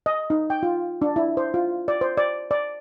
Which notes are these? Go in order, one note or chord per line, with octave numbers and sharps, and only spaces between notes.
D#5
D#4
G5
F4
D4
E4
C5
F4
D5
C5
D5
D5